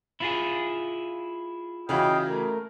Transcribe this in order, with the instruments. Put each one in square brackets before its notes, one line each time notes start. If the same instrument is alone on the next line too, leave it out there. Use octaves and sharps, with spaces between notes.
[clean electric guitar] E4 F4 G#4
[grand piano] C#3 E3 F#4 [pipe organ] D#5 F5 G5
[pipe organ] A3 A#4